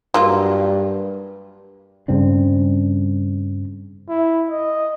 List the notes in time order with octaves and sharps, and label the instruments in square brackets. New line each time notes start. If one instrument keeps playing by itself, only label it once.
[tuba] G2 [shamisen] F#3 A#3 F4
[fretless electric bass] G2 C#3 C4 D4
[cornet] E4
D#5